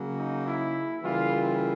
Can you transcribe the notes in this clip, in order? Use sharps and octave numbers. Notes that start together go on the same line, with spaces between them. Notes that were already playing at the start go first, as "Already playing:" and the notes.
Already playing: C#3 F#3 A#3
D#4
E4
C#3 E3 G3 A#3 F4